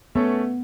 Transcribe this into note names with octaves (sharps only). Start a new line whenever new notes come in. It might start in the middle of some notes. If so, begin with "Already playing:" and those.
A3 B3 C#4 A4 C#5 E5